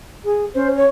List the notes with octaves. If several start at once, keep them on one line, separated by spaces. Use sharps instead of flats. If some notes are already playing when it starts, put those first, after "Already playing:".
G#4
C#4 C5
C#5